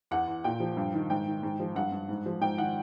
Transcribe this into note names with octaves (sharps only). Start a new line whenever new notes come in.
E2 F#5
E2
A#2 G5
F3
G2
D#3
G#2 G5
D#3
G#2
F3
G2 F#5
G2
G#2
F3
G#2 G5
D#3 F#5